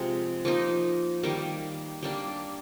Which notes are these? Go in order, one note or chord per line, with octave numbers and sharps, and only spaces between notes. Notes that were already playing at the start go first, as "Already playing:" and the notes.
Already playing: C3 F3 G#3
F3 A#3 D#4
D#3 G3 A#3
G3 A#3 D4